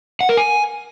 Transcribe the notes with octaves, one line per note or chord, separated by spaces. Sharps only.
F#5
A#4
G#5